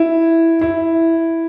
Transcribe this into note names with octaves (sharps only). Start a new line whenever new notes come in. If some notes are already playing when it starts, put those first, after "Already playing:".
Already playing: E4
E4